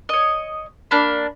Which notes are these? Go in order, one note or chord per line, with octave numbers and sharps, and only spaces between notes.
C#5 D#5
A#3 D4 B5